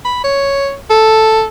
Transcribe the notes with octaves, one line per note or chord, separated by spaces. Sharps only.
B5
C#5
A4